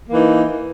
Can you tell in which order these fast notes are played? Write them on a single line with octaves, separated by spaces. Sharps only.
A#3 E3 D#4